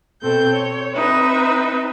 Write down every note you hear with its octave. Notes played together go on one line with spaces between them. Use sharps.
B2 C4 A4 G6
C#5
C4 D#4 B4 E5